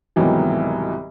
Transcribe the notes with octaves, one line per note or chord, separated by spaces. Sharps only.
C2 G#2 B2 D#3 E3 F#3